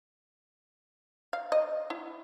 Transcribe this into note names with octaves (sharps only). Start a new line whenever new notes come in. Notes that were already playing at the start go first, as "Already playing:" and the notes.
F5
D#5
E4